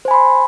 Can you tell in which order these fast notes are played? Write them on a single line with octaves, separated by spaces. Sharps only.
C5 G#5 B5 C6